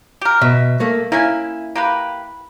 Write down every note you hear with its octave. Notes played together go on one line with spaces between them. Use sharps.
G4 A#4
B2 E5
A3 A#3
A#3 C#4 E4 G#5
A#3 G4 B4